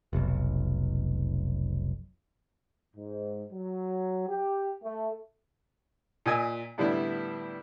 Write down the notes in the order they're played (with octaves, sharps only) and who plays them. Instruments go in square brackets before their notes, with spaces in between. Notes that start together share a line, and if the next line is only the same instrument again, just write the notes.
[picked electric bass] F1 B1
[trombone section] G#2
F#3
G4
A3
[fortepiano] A#2 D#5 G#5 E6
A2 D3 G3 B3 D4 E4